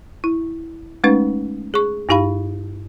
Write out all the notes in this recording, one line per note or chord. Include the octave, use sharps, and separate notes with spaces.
E4
G#3 A3 C#4 D#4 B4
G#4 C#6
G2 D#4 G4 F5 B5